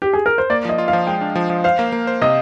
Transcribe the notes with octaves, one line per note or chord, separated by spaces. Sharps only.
G4
G#4
A#4
C5
A#3 D5
F3 D#5
F4
F5
F3
G#3 G5
D4
F3
F3
C5 F5
A#3
A#3
C5
C3 D#5